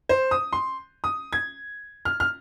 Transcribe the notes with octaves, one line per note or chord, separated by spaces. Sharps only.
C5
D#6
C6
D#6
G#6
F6
F6